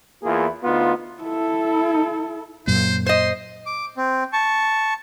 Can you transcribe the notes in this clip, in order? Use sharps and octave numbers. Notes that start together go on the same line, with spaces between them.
E2 A#3 E4 F4 G#4
D2 B3 D#4 F4
E4 A4
F#2 A#2 C5
C5 D#5 C6
D6
C4
A5 C#6